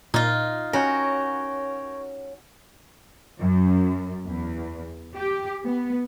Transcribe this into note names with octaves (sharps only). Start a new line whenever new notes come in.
A#2 D#4 F4
C#4 F#4 A#4 C#5 G5
F#2
E2
G4
B3